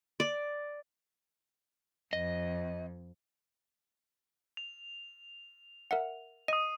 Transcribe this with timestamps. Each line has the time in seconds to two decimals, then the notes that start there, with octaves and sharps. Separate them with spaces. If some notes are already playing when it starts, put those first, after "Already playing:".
0.20 D5
2.13 F2 D#5
4.57 F7
5.91 A#4 E5 F#5
6.48 D#5 D#6 D#7